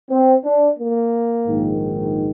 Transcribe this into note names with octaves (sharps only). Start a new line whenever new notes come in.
C4
D4
A#3
A#1 G#2 D#3